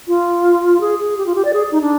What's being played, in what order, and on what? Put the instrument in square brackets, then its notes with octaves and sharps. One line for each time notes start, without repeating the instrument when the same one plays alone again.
[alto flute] F4
G#4
G#4
G4
F4
G4
D5
G#4
D#4
D4